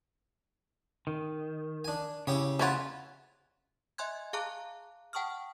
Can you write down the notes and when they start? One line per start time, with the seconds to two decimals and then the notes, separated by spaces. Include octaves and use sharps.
1.07 D#3
1.84 D4 G#5
2.27 C#3 E4 G4 C#5
2.59 C#4 E4 F4 C5 F#5
3.98 D#5 E5 G#5 C6 F#6 G#6
4.33 G#4 F5 A5 A#5 D6 F#6
5.13 F#5 G5 A5 C#6 D#6 F6